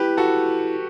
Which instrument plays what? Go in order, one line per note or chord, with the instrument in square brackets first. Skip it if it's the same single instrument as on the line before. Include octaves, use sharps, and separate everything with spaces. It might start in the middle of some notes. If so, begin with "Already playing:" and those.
Already playing: [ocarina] E4 [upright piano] G4 B4
[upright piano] F#4 A4